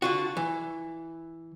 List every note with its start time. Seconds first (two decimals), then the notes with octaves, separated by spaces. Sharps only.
0.02 D3 F4 F#4
0.37 E3